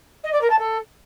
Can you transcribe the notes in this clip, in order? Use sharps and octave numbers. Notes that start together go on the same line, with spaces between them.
D#5
D5
A#4
A5
A4